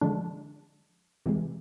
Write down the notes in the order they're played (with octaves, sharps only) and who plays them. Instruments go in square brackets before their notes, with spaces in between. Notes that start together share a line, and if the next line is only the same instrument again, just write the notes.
[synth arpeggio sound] D3 F3 G#3 D4
C3 E3 G#3